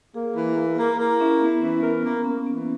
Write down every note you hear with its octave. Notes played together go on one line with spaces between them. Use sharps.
A#3 G#4
E3
A#3
A#3
A#3 E4
C#4 E4
B3 E4
E3 C#4
B3 A#4
A#3 B3
A#3 C#4
E3 B3